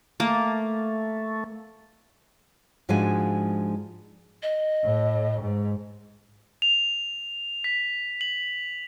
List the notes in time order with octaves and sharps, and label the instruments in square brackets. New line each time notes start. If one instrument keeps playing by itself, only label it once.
[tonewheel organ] A3 [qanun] A#3
[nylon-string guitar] G#2 F3 G#3 D4 F#4 G#5
[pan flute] D#5
[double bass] A2
G#2
[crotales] F7
B6
F#7